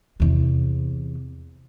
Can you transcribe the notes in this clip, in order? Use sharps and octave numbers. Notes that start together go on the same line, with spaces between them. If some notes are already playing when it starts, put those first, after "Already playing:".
E2 C3